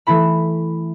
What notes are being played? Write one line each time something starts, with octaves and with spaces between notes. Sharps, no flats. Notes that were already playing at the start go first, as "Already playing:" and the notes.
E3 A3 E4 B5